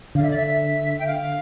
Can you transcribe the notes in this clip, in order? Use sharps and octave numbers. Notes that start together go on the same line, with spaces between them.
D3 F5
E5
D5
E5
G5
F5